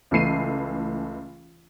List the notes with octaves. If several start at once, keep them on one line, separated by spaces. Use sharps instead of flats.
C#2 E3 A3 C7 D#7